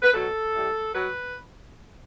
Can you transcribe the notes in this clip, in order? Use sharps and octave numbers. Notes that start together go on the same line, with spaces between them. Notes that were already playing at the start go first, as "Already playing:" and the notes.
B4
B2 F#3 A4
A2 G3
F#3 B4